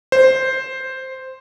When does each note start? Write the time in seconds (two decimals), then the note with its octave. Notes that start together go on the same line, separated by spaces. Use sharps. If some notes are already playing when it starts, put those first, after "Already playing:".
0.12 C5